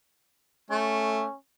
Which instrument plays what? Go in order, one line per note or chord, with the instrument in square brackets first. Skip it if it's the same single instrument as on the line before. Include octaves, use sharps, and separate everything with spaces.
[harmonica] A3 [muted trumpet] C#4